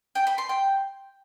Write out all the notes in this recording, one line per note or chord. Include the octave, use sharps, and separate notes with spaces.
G5
B5
C6
G5